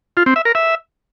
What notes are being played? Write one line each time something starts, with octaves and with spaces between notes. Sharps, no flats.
F4
C4
E5
A#4
E5